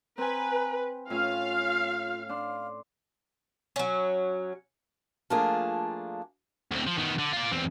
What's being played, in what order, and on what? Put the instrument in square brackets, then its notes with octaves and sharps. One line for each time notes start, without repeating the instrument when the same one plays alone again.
[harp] C4 G#5 [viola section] B4 [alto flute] A#5
[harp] A2 C#4 [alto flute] F4 [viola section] F5
[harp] D4 C6 [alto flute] F5
[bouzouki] F#3 C#4
[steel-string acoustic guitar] F3 A3 A#3 D4 F4 G#4
[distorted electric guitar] D2 C4
F3
D#3 B3
D3
F4 D5
E2 C4